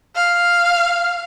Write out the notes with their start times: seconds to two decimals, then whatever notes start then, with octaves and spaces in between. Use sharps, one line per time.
0.16 F5